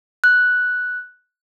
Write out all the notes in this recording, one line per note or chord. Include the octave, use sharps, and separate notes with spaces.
F#6